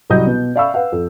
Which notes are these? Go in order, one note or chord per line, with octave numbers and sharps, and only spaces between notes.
C2 F#3 G3 D#5 G6
B2
D5 E5 F5 B5 C#6 E6
B4 F5 F#5
F2